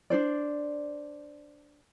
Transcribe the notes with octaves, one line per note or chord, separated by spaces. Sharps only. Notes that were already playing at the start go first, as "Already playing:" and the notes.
D4 D#4 C5 D5